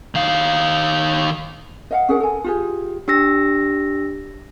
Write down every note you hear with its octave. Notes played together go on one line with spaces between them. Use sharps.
D#3 F5
D#5 F5 F#5
C#4 G#4 A#4 F#5
A4 G#5
F4 G4 G#4
D4 G4 E6 A#6